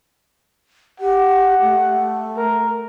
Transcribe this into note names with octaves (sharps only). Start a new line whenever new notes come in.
G4 F#5
A3
A#4